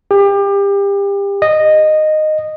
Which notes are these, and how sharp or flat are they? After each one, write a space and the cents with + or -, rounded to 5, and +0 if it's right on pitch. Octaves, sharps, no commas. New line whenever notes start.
G4 +30
D#5 -10